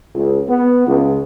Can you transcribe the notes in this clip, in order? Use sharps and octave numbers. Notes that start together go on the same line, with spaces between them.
C#2
B3
C#2